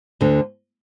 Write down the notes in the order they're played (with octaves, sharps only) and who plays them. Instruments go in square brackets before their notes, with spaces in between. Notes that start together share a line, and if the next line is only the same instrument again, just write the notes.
[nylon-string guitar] D2 D3